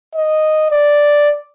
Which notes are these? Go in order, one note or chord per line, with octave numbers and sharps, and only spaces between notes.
D#5
D5